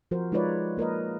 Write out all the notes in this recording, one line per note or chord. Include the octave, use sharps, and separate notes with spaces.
F3 F#4 A#4 C5
G#3 D#4 F4 B4 C#5 D5
A#3 A#4 B4 D#5